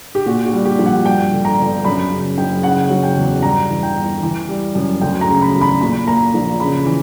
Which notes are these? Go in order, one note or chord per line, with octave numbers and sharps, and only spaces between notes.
G4
A#2 F#4
F#4
G3
G4
A#1
F#5
G2 G5
D3
A#5
G1
F#2 B5
C#3
F#1 G5
C#3 F#5
F#3
G5
E2
G2 A#5
E3
G5
G1
E3
G3
F#2
D2 G5
A#5
C#3
B5
E1
B5
A#2 B5
A#3 A#5
A#1
C#3 B5
E3